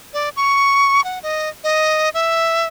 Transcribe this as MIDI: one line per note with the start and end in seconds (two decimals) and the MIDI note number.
0.13 0.29 74
0.36 1.04 85
1.04 1.19 78
1.23 1.49 75
1.64 2.09 75
2.14 2.67 76